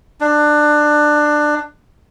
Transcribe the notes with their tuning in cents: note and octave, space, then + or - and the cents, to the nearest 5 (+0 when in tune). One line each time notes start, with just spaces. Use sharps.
D4 +20